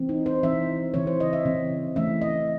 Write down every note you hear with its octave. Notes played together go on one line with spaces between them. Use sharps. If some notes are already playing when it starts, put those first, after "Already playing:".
Already playing: E3 C4
D#4
C5
E3 C4 E5
C#3 E3 C4 C#5
C5
D#5
E5
C#3 E3 C4
E3 A3 C#4 E5
D#5